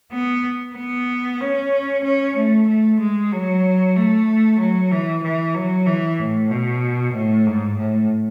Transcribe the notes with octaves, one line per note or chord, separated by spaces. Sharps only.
B3
B3
C#4
C#4
A3
A3
G#3
F#3
A3
F#3
E3
E3
F#3
E3
A2
B2
A2
G#2
A2